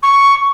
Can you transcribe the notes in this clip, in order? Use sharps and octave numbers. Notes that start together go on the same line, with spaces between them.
C#6